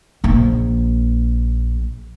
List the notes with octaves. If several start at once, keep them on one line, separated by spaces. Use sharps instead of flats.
A#1 A#3